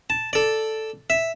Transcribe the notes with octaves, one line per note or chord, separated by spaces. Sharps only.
A5
A4 D5
E5